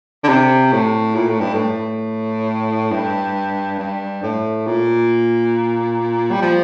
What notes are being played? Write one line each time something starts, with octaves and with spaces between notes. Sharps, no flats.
D3
C3
A2
A#2
A2
G2
A2
G2
G2
A2
A#2
G3
F3